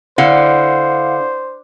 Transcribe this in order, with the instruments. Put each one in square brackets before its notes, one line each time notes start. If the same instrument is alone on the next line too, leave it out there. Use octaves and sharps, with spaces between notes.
[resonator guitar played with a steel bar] D3 [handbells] E4 F5 F#5 [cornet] C5